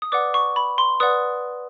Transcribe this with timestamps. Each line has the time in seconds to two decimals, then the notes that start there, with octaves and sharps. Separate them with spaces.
0.02 D#6
0.12 B4 D5 F#5 D6
0.34 C#6
0.56 B5
0.78 C6
1.00 B4 D5 F#5 D#6